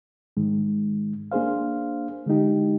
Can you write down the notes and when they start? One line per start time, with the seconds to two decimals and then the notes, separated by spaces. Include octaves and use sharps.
0.37 G#2 D#3 G#3
1.32 A#3 D4 G#4 C5 F5
2.26 D3 G#3 D#4 G4